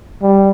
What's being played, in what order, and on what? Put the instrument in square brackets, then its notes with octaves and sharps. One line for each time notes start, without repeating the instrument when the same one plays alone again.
[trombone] G3